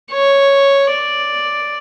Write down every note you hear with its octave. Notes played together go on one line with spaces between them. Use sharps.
C#5
D5